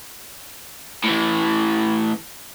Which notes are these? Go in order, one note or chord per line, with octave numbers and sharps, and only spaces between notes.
A2 E3